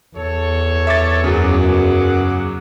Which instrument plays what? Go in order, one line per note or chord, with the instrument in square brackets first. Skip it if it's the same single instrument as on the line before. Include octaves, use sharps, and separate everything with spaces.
[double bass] E2 [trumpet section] A4 C#5
[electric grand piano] E5 D6 A6
[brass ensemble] F#2 [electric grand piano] C#3 F#3 [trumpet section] G#4 F#5 D6